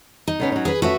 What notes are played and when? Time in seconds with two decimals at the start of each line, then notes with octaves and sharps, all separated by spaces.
0.28 D#4
0.40 C#3 B3 C#4
0.52 F#3 C#4
0.65 G#4 B4
0.82 A3 C#4 F#4 B4 E5